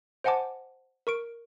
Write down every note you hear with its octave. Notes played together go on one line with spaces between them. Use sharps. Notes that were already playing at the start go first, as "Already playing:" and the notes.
C5 D#5 F#5 G#5 A5 D6
A#4 C#6 D7